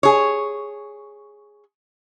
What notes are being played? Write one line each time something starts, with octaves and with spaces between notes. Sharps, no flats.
G#4 C#5